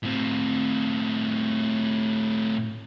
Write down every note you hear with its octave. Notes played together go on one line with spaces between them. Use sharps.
A2 C4